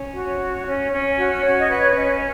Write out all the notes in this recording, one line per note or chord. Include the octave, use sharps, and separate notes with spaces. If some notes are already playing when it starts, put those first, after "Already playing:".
Already playing: C#4
F#4
C#5
C#4
C#4
F#4
C#5
D#5
B4 F#5
C#4 D#5